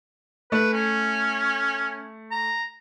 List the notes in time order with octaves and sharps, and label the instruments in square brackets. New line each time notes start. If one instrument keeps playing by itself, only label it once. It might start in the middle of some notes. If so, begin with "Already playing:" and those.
[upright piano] A3 [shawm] B4
[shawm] C#4
A#5